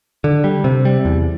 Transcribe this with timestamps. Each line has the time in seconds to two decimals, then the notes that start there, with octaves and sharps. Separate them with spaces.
0.24 D3
0.44 G3
0.64 C3
0.85 G3
1.05 E2